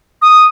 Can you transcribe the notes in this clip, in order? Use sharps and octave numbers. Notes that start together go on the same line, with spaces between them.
D#6